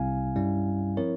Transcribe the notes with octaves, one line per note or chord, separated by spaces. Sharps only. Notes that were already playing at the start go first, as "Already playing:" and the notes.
Already playing: C2 C3 G3 C4 E4 F5 G#5
G2 G3 C#4 E4
F3 C4 E4 A#4 C#5